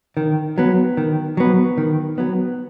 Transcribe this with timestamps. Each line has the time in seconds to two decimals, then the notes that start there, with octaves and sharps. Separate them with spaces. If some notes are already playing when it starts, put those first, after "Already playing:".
0.17 D#3
0.58 F#3 B3
0.97 D#3
1.37 F#3 B3
1.78 D#3
2.18 F#3 B3